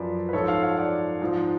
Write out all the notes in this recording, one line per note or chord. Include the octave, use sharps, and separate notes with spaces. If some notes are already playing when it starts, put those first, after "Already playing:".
Already playing: F#2 F3 B4 D5
B4
G#2 F3 A4 C#5
C#5 F5
C#5 F5
D5 F#5
G#2 F3